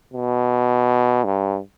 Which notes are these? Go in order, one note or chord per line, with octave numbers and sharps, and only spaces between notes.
B2
G2